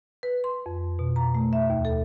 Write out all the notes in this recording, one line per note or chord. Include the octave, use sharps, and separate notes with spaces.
B4
C6
F2
B2
A#5
A3
E5
D#2
A4